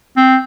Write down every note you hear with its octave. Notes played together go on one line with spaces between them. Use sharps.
C4